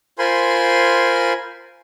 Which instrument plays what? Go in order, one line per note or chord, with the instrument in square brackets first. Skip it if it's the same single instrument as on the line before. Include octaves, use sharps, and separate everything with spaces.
[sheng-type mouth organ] F4 A#4 C5 G#5 B5 C6